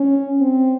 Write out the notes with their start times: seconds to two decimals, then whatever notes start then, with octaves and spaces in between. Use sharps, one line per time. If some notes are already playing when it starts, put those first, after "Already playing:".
Already playing: C#4
0.41 C4